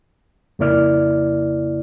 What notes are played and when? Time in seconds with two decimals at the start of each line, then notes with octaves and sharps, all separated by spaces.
0.59 F2 C#3 A#3 E4 D5 F6